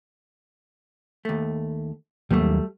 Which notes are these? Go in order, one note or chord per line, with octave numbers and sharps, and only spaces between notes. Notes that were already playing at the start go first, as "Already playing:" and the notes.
D#2 A3
D#2 F#3 G3 A3 A#3